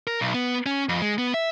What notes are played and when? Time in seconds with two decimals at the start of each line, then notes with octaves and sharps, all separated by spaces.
0.07 A#4
0.21 B1
0.34 B3
0.66 C#4
0.89 F2
1.02 G#3
1.18 B3
1.34 E5